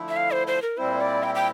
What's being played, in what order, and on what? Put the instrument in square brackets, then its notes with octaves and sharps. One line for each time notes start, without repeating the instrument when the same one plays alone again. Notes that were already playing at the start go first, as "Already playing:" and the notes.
Already playing: [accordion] D3 F3 A3 E4
[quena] E5
F5
C5
C5
A#4
[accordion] A#2 G3 C4 E4 [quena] C5
[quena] D5
G5
G5